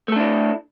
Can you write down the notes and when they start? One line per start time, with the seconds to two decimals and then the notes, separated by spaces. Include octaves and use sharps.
0.08 A3
0.12 A4
0.16 D4
0.20 E4